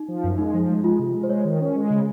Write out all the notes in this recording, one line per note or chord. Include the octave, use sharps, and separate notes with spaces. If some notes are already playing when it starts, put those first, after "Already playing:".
Already playing: D#4
F3
F#2
G#3 D#4
F3
G#3
G#3 F4
C3
G#3
C5
G#3 C#5
D#3
C#4
G#3
C#3